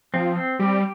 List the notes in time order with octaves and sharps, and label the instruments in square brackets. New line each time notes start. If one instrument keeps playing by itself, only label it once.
[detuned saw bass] F3 [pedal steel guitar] C4
[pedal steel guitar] C4
[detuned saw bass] G3 [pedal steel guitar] G4